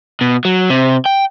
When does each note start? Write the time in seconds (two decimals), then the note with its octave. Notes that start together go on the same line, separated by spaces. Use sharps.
0.21 B2
0.45 F#3
0.70 C3
1.06 G5